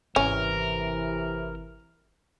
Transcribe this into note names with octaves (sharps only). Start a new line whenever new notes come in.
G#1 C3 E3 C#4 A#4